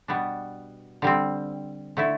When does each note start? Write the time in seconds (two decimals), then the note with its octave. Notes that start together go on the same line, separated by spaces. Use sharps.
0.08 B2 G3 B3 D4
1.02 D3 G3 C4
1.97 D3 A3 E4